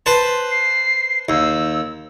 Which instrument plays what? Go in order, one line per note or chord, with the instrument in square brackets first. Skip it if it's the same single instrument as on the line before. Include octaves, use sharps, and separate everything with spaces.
[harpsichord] B4 C5 A5
[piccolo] C7
[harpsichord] D#2 [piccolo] E6